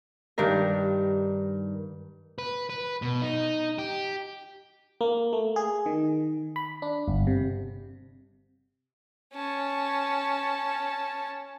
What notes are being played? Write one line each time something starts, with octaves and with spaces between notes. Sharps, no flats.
G2 D#3 D4 A#4
B4
B4
B2
D#4
G4
A#3
A3
G#4
D#3
B5
D4
G1
C3
C#4 A5